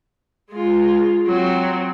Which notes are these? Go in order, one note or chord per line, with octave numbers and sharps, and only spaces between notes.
G#3 F4
F#3 C4